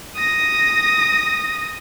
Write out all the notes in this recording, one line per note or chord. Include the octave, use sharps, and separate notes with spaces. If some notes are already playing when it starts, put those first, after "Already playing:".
D#6 A#6